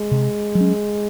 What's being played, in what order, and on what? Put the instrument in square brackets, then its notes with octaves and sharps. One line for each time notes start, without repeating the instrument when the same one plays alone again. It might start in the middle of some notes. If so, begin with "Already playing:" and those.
Already playing: [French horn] G#3
[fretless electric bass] C3
F#3
C#4